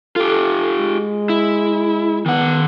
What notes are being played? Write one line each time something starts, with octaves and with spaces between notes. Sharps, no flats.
F4 G4 A4
G#3
E4
D#3 B3 F#5